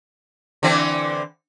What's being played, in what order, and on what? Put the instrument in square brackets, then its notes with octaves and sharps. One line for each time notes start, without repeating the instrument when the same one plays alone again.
[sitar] D3 E3 C4